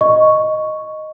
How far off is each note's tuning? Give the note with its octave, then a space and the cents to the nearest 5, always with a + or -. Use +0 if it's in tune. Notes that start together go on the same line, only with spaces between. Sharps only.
D#5 +0 C#6 +0